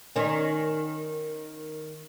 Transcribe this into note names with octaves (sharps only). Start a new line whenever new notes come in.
D#3 C#4